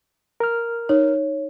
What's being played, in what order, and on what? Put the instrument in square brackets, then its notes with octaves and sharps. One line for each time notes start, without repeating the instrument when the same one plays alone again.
[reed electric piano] A#4 F6
[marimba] D#4 [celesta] C#5